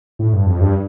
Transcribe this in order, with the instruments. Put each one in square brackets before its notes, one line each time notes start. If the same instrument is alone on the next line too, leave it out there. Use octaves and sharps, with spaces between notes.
[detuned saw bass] A2
G2
F2
G2